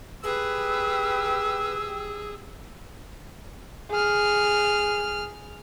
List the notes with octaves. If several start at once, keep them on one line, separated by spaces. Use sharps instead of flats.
G4 G#4 B4 E6
G#4 F6